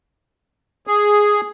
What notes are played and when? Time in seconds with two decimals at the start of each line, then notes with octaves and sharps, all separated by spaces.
0.87 G#4